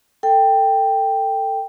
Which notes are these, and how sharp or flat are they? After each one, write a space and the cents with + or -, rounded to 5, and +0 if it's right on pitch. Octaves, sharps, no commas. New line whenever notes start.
A4 +20 G5 +0